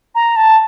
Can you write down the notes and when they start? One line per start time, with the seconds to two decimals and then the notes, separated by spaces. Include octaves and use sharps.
0.15 A#5
0.36 A5